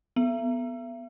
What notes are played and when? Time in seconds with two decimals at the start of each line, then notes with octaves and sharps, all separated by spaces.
0.16 B3